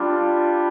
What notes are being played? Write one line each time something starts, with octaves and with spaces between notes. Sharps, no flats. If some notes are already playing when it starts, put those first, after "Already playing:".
Already playing: G3 D4 F4